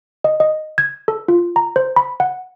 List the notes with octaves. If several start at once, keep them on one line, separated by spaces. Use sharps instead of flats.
D#5
D#5
G#6
A4
F4
A#5
C5
B5
F#5